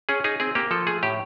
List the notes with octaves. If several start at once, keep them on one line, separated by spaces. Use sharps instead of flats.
C#4 G#4
D#4 G#4
C4 G#4
A#3 G4
F3 A4
A3 G#4
A2 G4